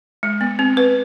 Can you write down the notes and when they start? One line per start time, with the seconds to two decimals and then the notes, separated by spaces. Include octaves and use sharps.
0.23 G#3
0.41 B3
0.59 C4
0.77 B4